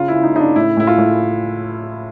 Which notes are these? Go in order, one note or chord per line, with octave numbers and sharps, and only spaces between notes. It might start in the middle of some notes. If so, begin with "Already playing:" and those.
Already playing: C#3 F4
E4
C#3
D#4
C#3 D#4
D4
A2 E4
A2 E4
F4
A2